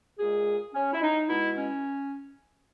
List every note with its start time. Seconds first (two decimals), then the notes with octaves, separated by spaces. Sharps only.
0.19 A#2 G#3 G#4
0.74 C#4
0.93 E4
1.02 D#4
1.29 B2 G#3 E4
1.57 C#4